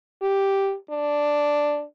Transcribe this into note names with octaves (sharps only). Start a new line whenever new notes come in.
G4
D4